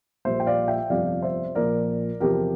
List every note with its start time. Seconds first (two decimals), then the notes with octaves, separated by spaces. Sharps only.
0.25 A#1 A#2 G3 C5 E5
0.40 G5
0.47 D5 F5
0.68 E5 G5
0.90 G1 F2 C3 F3 D5 F5
1.22 C5 E5
1.55 A#1 A#2 F3 A#4 D5
2.20 E2 C3 F3 G4 A#4